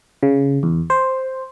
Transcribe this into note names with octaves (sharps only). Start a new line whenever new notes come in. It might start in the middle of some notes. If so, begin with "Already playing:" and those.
C#3
E2
C5